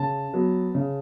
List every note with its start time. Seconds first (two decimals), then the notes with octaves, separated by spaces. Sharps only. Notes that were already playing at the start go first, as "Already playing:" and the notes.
Already playing: C#3 A5
0.34 F#3 B3
0.75 C#3